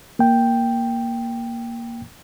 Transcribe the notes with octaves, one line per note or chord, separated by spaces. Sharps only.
A#3 G5